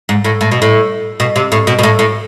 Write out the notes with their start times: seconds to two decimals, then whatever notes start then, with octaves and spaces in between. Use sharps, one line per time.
0.09 G#2
0.24 A2
0.41 A2
0.52 B2
0.62 A2
1.20 B2
1.36 C3
1.52 A2
1.67 B2
1.79 B2
1.83 A2
1.99 A2